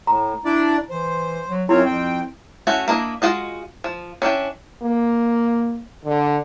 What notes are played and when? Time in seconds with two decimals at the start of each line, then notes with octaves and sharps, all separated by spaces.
0.07 A2 A#5
0.45 D4 E4 D5
0.90 E3 C5
1.47 F#3
1.69 F#2 C4 E4 F4 C#5
1.86 F2 G5
2.67 A3 C#4 E4 F#4
2.88 A#3 D4 E4 D#5
3.22 G#3 F4 F#4 D#5
3.84 F3
4.22 C#4 D4 E4 G5
4.83 A#3
6.05 D3